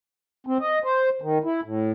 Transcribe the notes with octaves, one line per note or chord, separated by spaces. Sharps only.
C4
D#5
C5
D#3
E4
A2